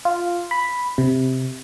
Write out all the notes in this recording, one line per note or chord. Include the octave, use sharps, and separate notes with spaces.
F4
B5
C3